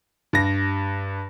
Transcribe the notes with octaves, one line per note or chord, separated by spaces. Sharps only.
G2 A#6